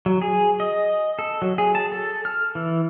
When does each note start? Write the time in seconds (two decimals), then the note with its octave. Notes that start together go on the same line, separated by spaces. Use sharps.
0.06 F#3
0.22 G#4
0.60 D#5
1.19 A4
1.42 F#3
1.58 G#4
1.75 A5
1.92 A4
2.25 F6
2.55 E3